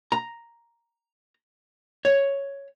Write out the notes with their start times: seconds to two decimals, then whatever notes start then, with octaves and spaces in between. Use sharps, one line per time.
0.12 A#5
2.05 C#5